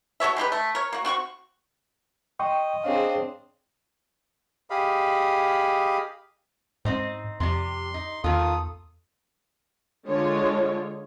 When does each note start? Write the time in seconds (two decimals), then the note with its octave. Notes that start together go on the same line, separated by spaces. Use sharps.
0.20 F#4 A4 C#5 E5
0.37 G#3 D#4 G4 B4
0.52 A3
0.75 A#4 C#5
0.93 A#3 F#4
1.05 C4 F#4 F#5 C#6
2.40 D#5 G5 C6 C#6
2.84 C4 D4 G#4 C#5 F5
4.70 G4 G#4 D#5 F5 B5
6.85 G#2 C4 D#4 C5
7.40 F2 C3 G3 C6
7.94 D#4
8.24 E2 D#3 F4 A4 D#6
10.07 D3 G#3 F4 C#5